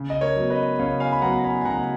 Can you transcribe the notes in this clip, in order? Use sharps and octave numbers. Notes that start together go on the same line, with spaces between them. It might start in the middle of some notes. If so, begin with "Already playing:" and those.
Already playing: C#3
D#5
A#4 C#5
F#3 B3
B4 D#5
C#3 C#5 F5
F5 G#5
B5
F#3 B3 F#5 A#5
A#5
G#5 B5
G#5
C#3 F#5 A#5